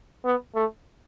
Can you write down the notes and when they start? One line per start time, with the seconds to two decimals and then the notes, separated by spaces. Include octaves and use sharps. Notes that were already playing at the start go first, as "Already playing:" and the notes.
0.25 B3
0.55 A3